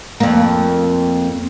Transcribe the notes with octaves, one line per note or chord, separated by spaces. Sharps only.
F2 A#3